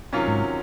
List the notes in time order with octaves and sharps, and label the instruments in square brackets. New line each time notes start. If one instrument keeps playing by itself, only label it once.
[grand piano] C3 D#3 F#3 C#4 F4
[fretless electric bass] G#2